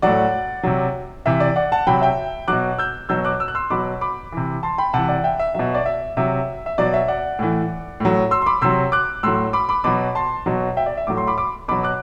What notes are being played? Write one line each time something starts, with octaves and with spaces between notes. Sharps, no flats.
A2 F#3 D5 F#5
C3 F#3
C3 E3 E5
D5
D5 F#5
F#5 A5
C3 F#3 G5 B5
E5 G5
B2 F#3 D6 F#6
E6 G6
B2 F#3 E6 G6
D6 F#6
E6
F#6
C6 E6
B2 F#3 B5 D6
B5 D6
C3 E3
A5 C6
G5 B5
C3 E3 F#5 A5
D5 F#5
E5 G5
E5
B2 F#3 E5
D5
E5
C3 F#3 E5
E5
B2 F#3 D5
E5
D5 F#5
A2 E3
A2 F#3
C6 E6
C6
B5 D6
C3 F#3 C6 E6
D6 F#6
A2 F#3 C6 E6
B5 D6
B5 D6
B2 F#3 B5 D6
A5 C6
B2 F#3
E5 G5
D5
E5
A2 F#3 D6
C6
B5 D6
B5 D6
B2 F#3 B5 D6
D6 F#6